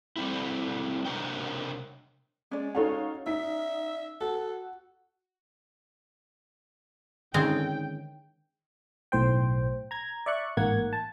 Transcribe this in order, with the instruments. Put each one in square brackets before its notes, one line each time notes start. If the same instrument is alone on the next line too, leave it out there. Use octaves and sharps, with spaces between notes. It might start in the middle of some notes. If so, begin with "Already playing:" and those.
[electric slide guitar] G3 A3 C4 E4
C3 D4 A#4 C#5 G5
[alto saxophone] G#3 [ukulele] C#4 D5
[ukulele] C#4 F#4 A4 [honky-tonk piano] D#4 C#5 F5
[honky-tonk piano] D#4 B6 [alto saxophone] E5
[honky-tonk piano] F#4 [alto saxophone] A4
[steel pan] D3 D#3 C#4 [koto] G#3 C4 [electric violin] G5
[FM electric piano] B1 A2 C5 G5
A#5 G#6
D5 E5 C#6 F#6
A1 G#2 A#3 F#5 G#6
A5